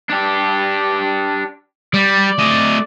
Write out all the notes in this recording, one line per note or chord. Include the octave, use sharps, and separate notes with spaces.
D4 G4
G3 D5
A3 D#5